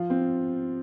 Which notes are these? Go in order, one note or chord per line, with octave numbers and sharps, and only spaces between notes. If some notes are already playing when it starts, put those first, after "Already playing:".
Already playing: F3 F4
C4